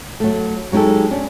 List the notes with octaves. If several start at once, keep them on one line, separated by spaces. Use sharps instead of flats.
F#3 A3
F#3 G#3 D#4 G4 A4
C#4 D4